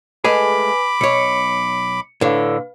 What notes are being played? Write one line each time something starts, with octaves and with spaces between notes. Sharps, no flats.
G#3 A3 G#4 B4 G#5 B5 D6
B1 C#5 C#7
A2 D3 B4 F5